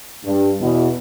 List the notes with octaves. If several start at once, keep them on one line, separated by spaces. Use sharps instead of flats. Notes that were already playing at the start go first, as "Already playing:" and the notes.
G2
E2 B2